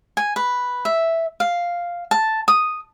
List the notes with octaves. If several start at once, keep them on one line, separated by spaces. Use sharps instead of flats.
G#5
B4
E5
F5
A5
D#6